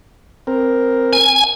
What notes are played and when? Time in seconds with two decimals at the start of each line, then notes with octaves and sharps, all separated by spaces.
0.47 C4 A#4
1.13 G#5